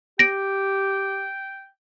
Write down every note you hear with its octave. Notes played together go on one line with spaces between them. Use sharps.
G4 G5 A#6 D7